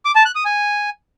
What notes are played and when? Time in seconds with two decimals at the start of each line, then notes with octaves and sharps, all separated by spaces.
0.05 D6
0.15 A5
0.25 F#6
0.35 D#6
0.45 G#5